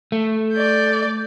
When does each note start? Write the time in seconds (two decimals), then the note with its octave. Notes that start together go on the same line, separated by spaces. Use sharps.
0.12 A3
0.53 D5 G6